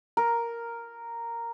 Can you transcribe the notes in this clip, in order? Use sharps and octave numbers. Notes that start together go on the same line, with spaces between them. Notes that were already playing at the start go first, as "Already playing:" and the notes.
A#4